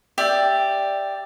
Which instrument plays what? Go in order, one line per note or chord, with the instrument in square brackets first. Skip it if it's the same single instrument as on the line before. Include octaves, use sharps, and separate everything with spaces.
[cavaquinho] G4 D5 E5